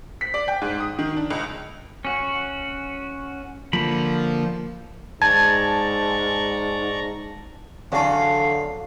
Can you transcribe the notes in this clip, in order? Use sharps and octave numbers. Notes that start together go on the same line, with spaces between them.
B6
D5
G5
G#2
D#6
D#3
D4
C#2
C#4 F#4
D3 F3 A#3 B5
G#2 D5 A5 A#5 C#6 G#6
E2 D3 F#3 C#4 A4 F5